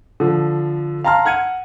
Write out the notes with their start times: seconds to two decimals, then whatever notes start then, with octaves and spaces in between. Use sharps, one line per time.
0.20 D3 F3
1.04 F5 A5 A#5 C6 F6
1.25 F#5 F6 G#6 C#7 D#7